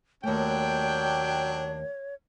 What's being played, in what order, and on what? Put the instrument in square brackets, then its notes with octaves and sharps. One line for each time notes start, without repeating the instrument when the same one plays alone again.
[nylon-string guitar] D#2 A3 [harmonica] F#3 D4 [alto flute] C#5 [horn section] G5